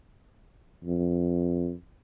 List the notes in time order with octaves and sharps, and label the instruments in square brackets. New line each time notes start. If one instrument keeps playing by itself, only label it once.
[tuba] F2